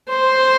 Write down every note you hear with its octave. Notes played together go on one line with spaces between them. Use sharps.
C5